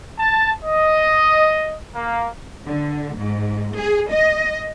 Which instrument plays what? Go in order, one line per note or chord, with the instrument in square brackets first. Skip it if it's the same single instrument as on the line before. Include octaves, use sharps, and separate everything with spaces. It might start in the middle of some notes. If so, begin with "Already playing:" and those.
[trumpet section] A5
D#5
A#3
[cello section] D3
G#2
G#4
D#5